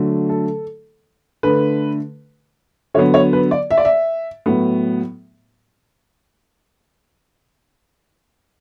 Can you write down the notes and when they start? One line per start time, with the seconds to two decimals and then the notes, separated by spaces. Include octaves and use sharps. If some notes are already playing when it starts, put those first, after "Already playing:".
Already playing: D3 F#3 A3
0.29 A4
1.43 D3 A3 B4
2.94 D3 F#3 B3 C#5
3.14 C#5
3.33 B4
3.51 D5
3.71 E5
3.78 D5
3.85 E5
4.46 A2 F#3 B3